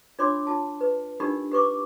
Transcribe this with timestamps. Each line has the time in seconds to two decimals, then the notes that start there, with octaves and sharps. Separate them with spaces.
0.19 D4 F4 C#5 B5 C6 D6
0.47 F4 A5
0.81 B4
1.20 D4 D#4 F4 G4 A#4 B5
1.52 G4 B4 C#6 D6